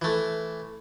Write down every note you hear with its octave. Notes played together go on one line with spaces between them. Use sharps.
E3 A3